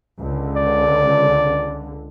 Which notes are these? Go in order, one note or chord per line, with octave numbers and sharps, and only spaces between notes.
C#2 D3
D5